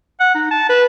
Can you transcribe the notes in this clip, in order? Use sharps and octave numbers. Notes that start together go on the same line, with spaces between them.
F#5
D#4
A5
B4